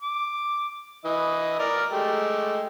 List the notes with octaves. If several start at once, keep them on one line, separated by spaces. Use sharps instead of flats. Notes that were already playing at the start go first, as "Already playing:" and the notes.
D6
E3 D#5
A#4 D5 F6
G#3 A3 G4